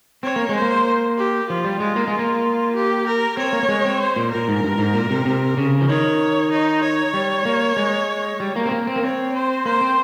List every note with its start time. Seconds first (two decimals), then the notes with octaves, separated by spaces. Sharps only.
0.23 C4 C#5
0.36 A#3
0.49 G#3
0.55 C5
0.62 A#3
1.18 G4
1.49 F3 F4
1.65 G3
1.80 G#3 F4
1.96 A#3
2.08 G#3
2.19 A#3
2.75 G4
3.06 A#4
3.37 C4 C#5
3.53 A#3
3.63 A#3
3.69 G#3
3.85 C4
4.00 C5
4.16 A#2
4.31 A#2 A#4
4.48 G#2
4.64 G2
4.78 G#2
4.94 A#2
5.10 C3
5.25 C3
5.57 C#3
5.81 F3
5.89 D#3 C#5
6.51 D#4
6.83 C#5
7.14 G3
7.45 A#3
7.76 G#3
8.40 G3
8.56 A#3
8.66 C4
8.72 A#3
8.87 C4
8.96 A#3
9.03 C4 C#5
9.34 C5
9.65 A#3 C5
9.81 C4